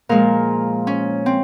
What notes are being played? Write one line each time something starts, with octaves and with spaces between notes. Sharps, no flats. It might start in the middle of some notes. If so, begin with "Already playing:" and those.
A#2 F3 G#3 A#4
C#4
C4